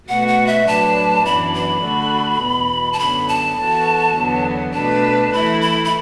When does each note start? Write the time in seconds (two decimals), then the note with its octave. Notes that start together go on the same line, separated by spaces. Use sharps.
0.09 B2 A3 F#4 B4 F#5
0.28 F#5
0.47 E5
0.66 A2 F#3 D4 B4 A5
1.25 F#2 E3 B3 D4 B5
1.54 B5
1.83 D3 A3 F#4 A4
2.41 E2 B2 B3
2.93 A5
2.99 F#2 D3 F#3 B3 B5
3.28 A5
3.57 E3 B3 F#4 A4
4.16 E2 D3 F#3 B3
4.74 B2 A3 D4 B4 A5
5.33 E3 A3 E4 B5
5.61 B5
5.85 B5